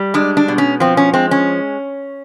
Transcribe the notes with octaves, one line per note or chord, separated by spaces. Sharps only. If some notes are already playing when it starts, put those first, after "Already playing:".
Already playing: G3
G#3 D4
D4
B2
C#4
F3 C4
C#4
G#3 C4
C#4